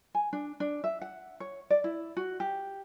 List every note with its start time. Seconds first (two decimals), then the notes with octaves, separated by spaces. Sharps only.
0.14 G#5
0.33 D4
0.60 D4
0.84 E5
1.01 F#5
1.40 C#5
1.70 D5
1.84 E4
2.17 F#4
2.40 G4